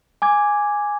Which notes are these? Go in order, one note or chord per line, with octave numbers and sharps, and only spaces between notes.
G#5 D6 G#6